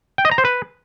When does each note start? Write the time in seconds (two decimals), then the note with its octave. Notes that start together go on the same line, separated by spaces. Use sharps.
0.18 G5
0.25 D#5
0.31 A#5
0.38 C5
0.45 B4